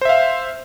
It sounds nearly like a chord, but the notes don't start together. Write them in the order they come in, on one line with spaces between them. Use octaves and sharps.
C5 E5 F5